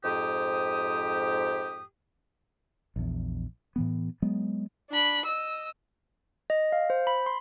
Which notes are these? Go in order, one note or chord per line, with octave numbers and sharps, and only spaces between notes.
F2 G#2 G4 D#6
A#1 E2
A2 E3 B3
F#3 G#3 B3
D4 B5
D#5 E6
D#5
F5
C5
B5
C6